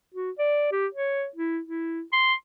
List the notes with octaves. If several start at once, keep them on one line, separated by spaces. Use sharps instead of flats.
F#4
D5
G4
C#5
E4
E4
C6